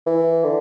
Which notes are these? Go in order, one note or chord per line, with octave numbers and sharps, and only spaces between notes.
E3
D3